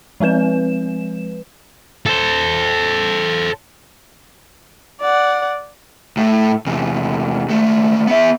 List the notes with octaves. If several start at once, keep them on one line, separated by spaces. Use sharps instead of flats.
F3 G#3 C4 B4 E7
A4 C5
D5 F#5
A2 A3
E2 C3
D#2 A3
B3 E5